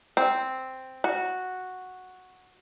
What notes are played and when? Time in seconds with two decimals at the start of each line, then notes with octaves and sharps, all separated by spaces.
0.17 C4
1.04 F#4